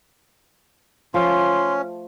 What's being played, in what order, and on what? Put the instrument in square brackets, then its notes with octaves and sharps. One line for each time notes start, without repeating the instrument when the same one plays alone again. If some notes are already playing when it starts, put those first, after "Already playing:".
[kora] F3 A3 F4 [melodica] C#4 [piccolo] C6